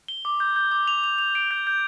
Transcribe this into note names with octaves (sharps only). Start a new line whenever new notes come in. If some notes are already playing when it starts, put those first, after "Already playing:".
G7
D6
G6
G6
D6
F7
F7
F7
D7
G6
G6